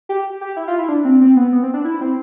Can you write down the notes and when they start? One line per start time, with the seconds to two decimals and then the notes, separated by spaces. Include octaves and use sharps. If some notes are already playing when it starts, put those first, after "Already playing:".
0.09 G4
0.41 G4
0.57 E4
0.68 F4
0.79 E4
0.89 D4
1.05 C4
1.21 C4
1.36 B3
1.52 B3
1.63 C4
1.74 D4
1.85 E4
2.01 C4